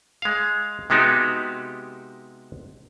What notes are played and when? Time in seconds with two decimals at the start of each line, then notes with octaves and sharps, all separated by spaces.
0.22 G#3 F5
0.90 C3 G#3 B3 D#4 F#4 G4